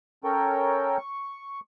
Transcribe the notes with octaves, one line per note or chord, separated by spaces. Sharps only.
C#4 A4 A#4 C#5 G5
C#6